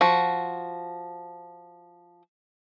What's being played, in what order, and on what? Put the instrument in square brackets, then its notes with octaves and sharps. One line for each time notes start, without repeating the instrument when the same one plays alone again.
[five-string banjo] F3 F#4